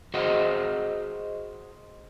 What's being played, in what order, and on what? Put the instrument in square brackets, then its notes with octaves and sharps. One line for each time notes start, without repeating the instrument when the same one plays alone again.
[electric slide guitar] F#4 G#4 C5 D#5 F#5